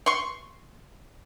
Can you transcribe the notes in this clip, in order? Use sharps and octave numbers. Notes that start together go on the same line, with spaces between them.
C6 C#6